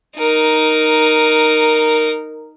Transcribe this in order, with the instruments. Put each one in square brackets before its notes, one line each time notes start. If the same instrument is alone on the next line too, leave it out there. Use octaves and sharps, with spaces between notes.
[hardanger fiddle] D#4 A#4